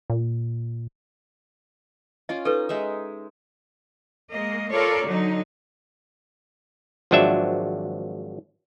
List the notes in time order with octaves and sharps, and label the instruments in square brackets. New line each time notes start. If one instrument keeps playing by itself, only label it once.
[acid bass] A#2
[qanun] C#4 F4 D5 [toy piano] D#5
[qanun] D#4 D#5 [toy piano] A4 B4
[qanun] G#3 D#4 E5
[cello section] G#3 A#3 D#5
F4 A4 A#4 C#5 D5
D3 F#3 D#4
[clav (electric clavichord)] G#1 F3 F#3 D4 E5